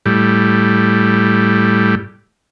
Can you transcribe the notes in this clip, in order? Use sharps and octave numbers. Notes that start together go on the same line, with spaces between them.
A2 G3